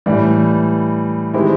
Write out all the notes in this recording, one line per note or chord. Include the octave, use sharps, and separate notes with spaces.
A2 E3 G3
D#3 G#3 C4 E4 G4